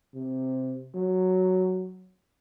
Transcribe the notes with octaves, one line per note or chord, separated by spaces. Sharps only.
C3
F#3